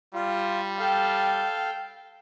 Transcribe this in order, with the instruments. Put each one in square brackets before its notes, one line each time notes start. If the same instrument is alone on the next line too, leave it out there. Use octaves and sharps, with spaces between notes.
[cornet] G3 [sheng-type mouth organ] F4
[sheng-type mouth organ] A4 F5 [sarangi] G5